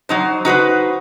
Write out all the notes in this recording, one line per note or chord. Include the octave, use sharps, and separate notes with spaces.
F#3 D#4 C5
D#4 F#4 B4 C5